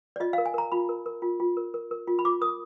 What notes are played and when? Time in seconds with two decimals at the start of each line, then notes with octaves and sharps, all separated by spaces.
0.16 D5
0.20 F4 D#5
0.33 A#4 F5
0.46 G#5
0.54 A#4 A#5
0.72 F4 B5
0.89 A#4
1.06 A#4
1.22 F4
1.40 F4
1.57 A#4
1.74 A#4
1.91 A#4
2.07 F4
2.19 B5
2.25 F4 D6
2.41 A#4 D#6